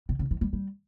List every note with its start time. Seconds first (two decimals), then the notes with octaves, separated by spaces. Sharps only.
0.09 B2
0.19 C#3
0.31 E3
0.41 G3
0.53 G3